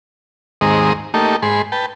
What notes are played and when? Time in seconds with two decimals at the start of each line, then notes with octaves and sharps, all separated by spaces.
0.61 D#2 G#2 G#3 C4 A#5 D#6
1.14 A3 A#3 D#4 G4 A4
1.42 G#2 G#4 B5 C6
1.72 B4 G5 A5